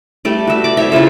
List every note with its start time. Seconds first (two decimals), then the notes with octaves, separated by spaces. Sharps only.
0.25 G3 A3 D5
0.47 F#4 E5
0.64 D5 D6
0.77 C5 C#5 E5
0.92 C#3 E4 F4 A4